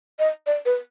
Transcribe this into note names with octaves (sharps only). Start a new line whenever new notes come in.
D#5
D5
B4